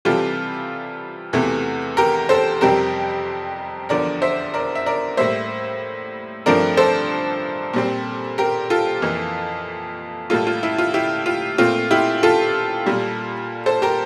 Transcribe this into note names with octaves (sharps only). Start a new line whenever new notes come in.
C3 E3 G3 C4 F4 A4
E2 C3 E3 A3
G4 A#4
A4 C5
F2 C3 G3 C4 G4 A#4
E2 D3 F3 A#4 D5
C5 E5
A#4 D5
E5
A#4 D5
A2 G3 A#3 C5 E5
G2 F3 A3 C4 A#4 D5
A4 C5
A#2 G3 C4
G4 A#4
F4 A4
F2 E3 A#3
A2 G3 A#3 F4 A4
F4
E4
F4
E4 G4
F4
A#2 A3 C4 F4
E4 G4
F4 A4
A#2 G3 A#3
A4 C5
G4 A#4